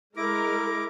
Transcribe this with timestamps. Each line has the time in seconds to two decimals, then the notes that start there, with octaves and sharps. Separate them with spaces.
0.17 G#3 E4 A#4 D6 A#6